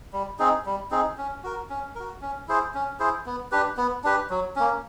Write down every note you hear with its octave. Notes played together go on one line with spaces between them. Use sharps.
G3
C4 D#4 G#4
G3
C4 D#4 G#4
C#4
F#4 A#4
C#4
F#4 A#4
C#4
E4 G#4 C5
C#4
E4 G#4 C5
B3
D4 G4 B4
B3
D4 G4 B4
F#3
A#3 C#4